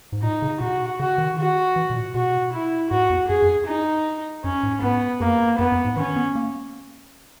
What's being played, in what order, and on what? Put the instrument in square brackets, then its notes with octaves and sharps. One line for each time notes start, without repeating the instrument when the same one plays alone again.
[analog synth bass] G#2
[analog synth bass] A#2 [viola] D#4
[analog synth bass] C#3
[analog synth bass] B2 [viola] F#4
[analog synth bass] C#3 [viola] F#4
[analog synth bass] D#3
[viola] F#4
[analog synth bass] E3
B2
A#2
[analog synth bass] B2 [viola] F#4
[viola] E4
[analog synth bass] G#2 [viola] F#4
[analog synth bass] E2
[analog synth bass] F#2 [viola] G#4
[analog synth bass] F#2
[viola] D#4
[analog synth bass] F#2 [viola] C#4
[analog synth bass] G#2
[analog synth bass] G#2 [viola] B3
[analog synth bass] F#2 [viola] A#3
[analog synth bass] F#2 [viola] B3
[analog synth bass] F#2
G#2
[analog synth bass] D#3 [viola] C#4
[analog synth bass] B3
A#3